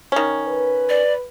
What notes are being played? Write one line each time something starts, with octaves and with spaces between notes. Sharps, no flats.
D#3 C#4
B4
D5